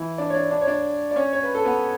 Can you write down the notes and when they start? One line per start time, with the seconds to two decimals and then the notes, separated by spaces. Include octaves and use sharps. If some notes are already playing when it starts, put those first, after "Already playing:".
Already playing: E3 E4
0.18 D4 D5
0.30 C#5
0.35 D4 D5
0.51 D4 D5
0.61 C#5
0.67 D4 D5
1.11 D5
1.16 C#4 C#5
1.33 C#5
1.43 B4
1.54 A4
1.65 B3 B4